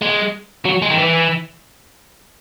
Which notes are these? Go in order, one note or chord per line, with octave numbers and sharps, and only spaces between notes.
G#3
F#3
G#3
D#3
E3